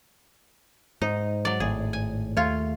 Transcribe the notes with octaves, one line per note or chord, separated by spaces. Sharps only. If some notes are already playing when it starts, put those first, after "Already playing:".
G#2 D#4
F#3 D5
G#1 A2 G#4
G#5
D#2 A3 F4 C#5